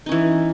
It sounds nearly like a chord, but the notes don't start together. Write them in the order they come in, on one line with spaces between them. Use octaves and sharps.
D#4 C#4 E3